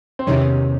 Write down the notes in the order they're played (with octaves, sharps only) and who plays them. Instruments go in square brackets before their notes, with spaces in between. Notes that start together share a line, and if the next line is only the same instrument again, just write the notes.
[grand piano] C4
[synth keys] E2 C3 D#3 [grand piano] C#4